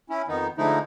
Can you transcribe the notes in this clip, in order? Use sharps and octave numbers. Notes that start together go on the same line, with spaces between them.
C#4 E4
F2 D#3 B3 D#4
D3 F3 G#3 A3 D#4 E4